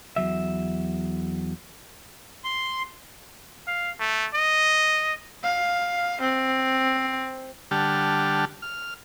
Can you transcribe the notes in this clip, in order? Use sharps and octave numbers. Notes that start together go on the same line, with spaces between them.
E2 F#3 E5
C6
F5
A3
D#5
F5
C4
D3 G3 G4 F#5 A5 F6
F6